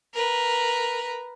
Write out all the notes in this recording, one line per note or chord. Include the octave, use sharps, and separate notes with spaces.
A#4 B4